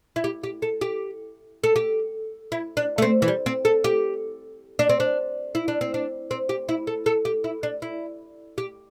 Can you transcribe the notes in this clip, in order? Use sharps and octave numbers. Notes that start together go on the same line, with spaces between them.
E4
G4
G4
A4
G4
A4
G4
E4
D4
A3
C4
E3
G3
C4
A4
G4
D4
C4
D4
E4
D4
C4
D4
C4
G4
E4
A4
A4
G4
E4
D4
E4
G4